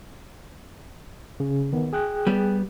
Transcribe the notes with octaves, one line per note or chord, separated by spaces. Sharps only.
C#3
D#3 B3
G#4 G5 F#6
G3 B3